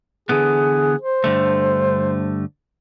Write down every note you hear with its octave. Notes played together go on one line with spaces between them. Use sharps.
D3 E3 B3 G#4
C5
G2 D3 A3